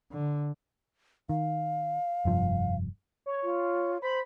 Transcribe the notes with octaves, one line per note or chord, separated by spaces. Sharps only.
D3
D#3 F5
F1 G2 F3
C#5
F4
C5 B5